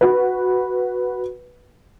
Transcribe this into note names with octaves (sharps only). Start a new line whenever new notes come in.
F#4 B4